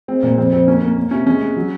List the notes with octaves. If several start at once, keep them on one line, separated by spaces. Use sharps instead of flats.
G#3 C4
A#2 A#3
F2 C4
F2 C4
A#3 C#4
A#3
A#3
C3 C#4
G#3 C#4
G#3
F#3